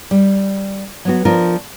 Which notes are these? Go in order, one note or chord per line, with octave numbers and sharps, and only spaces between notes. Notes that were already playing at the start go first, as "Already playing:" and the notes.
G3
F#3 B3 F#4
F3 D4 F4 A#4